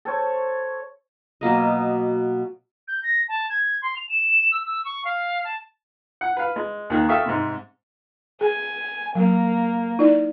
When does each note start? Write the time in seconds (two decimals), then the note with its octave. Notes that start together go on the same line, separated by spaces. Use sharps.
0.05 A4 C5 C#5
1.41 B2 F#3 A#3 D#5
2.88 G6
3.03 A#6
3.29 A5
3.50 G#6
3.82 C6
3.96 F7
4.09 E7
4.52 E6
4.66 E6
4.85 C#6
5.05 F5
5.45 A5
6.21 F#5
6.37 B4 F5
6.56 G#3
6.90 D#2 D#3 F#6
7.09 A4 E5 F5 G5 C#6 D#6
7.26 G#2 C3
8.41 G#4 G#5
9.15 F#3 A#3
9.99 D#4 E4 D5